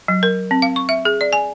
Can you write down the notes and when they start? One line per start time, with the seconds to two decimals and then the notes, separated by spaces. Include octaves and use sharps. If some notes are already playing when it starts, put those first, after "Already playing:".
0.08 F#3
0.23 A#4
0.51 C4
0.62 F5
0.76 C#6
0.89 E5
1.05 G#4
1.21 D5
1.33 G#5